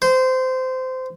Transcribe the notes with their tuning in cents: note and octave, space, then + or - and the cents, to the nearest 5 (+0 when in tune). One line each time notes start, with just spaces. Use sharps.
C5 -20